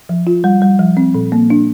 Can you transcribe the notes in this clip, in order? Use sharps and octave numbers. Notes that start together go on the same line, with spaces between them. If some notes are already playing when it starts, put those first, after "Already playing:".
F3
F4
G3
G3
F3
C4
A#2
A#3
D4